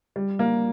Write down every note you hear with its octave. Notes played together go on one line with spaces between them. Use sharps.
G3
A#3